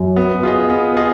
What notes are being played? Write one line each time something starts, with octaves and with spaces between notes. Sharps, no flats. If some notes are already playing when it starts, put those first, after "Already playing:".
Already playing: F#2
B3
F4 G#4 D#5
B3
F4 G#4 D#5